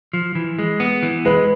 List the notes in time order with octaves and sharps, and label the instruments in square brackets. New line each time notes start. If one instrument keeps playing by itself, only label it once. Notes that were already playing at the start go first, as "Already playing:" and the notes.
[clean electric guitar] F3
E3
G#3
B3
E3
[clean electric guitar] G#3 [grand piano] B4